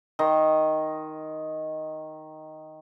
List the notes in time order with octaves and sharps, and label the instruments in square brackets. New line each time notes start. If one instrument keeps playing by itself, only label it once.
[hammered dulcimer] D#3 D#5 C6